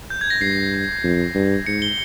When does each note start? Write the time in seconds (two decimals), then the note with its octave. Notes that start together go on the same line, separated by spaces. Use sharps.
0.10 G6
0.21 G#6
0.30 A#6
0.41 G2 C7
1.04 F2
1.35 G2
1.66 G#2 C#7
1.82 G7